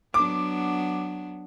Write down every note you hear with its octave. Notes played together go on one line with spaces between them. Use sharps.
F#3 B3 D4 D6